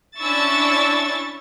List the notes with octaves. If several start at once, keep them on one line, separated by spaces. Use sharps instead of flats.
C#4 D4 E4 C#6 E6 A6